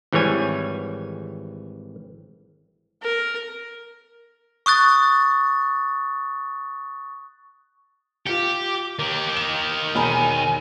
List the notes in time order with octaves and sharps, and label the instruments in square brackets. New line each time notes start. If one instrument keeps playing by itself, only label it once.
[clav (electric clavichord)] G#1 E3 G3 C#5 G#5
[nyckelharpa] A#4
[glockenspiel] C#6 D#6 F#6 A6
[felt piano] F4 C#7 [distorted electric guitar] G4 [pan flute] D6
[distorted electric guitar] D#3 G4
[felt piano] E7
[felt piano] E1 A#5 B5 [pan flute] G#5